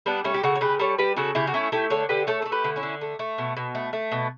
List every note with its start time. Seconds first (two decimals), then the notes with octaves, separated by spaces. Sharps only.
0.06 G3 B3 D4
0.24 G3 A3 C#4
0.34 G4
0.43 C#3 F#4 A4
0.56 C#5
0.61 C#3 G4 B4
0.79 G3 A4 C#5
0.98 G3 G4 B4
1.17 C#3 F#4 A4
1.35 C#3 E4 G4
1.47 F#4
1.54 A3 C#4 E4
1.72 A3 E4 G4
1.90 D3 A4 C#5
2.09 D3 G4 B4
2.27 A3 A4 C#5
2.42 A3 A4
2.52 G4 B4
2.64 D3
2.76 C#4 E4
2.83 D3
3.01 A3
3.19 A3
3.38 B2
3.57 B2
3.75 A3
3.93 A3
4.12 B2